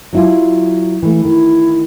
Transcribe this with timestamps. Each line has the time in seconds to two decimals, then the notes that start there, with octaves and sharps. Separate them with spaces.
0.13 F#3 E4 F4
1.02 E3 A3
1.25 D#3 E4